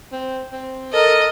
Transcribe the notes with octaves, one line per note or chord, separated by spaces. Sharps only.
C4
C4
A4 A#4 D#5